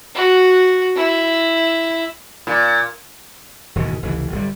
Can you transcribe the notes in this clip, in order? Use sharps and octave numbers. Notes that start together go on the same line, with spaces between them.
F#4
E4
A#2
E1 D#2 G#2 C#3
F1 C#2 E3
G1 D3 G3